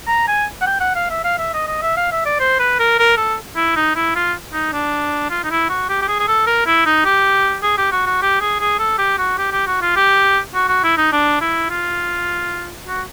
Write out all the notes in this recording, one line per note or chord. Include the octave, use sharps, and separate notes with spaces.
A#5
G#5
F#5
G5
F#5
F5
E5
F5
E5
D#5
D#5
E5
F5
E5
D5
C5
B4
A#4
A#4
A4
E4
D#4
E4
F4
D#4
D4
F4
D#4
E4
F#4
G4
G4
G#4
G#4
A4
A#4
E4
D#4
G4
G#4
G4
F#4
F#4
G4
G#4
G#4
A4
G4
F#4
G4
G4
F#4
F4
G4
F#4
F#4
E4
D#4
D4
E4
F4
F#4